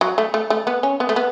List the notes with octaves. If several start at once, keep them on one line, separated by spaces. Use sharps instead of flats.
F#3
A3
A3
A3
B3
C#4
B3
A3
B3